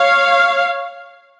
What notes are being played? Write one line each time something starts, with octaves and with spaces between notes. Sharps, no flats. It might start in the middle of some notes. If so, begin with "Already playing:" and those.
Already playing: C#5 F5